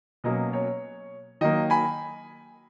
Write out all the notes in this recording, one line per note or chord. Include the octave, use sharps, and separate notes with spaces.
B2 F#3 A#3 C#4 D#5
C#5
D#3 F#3 A#3 D#5
G#5 B5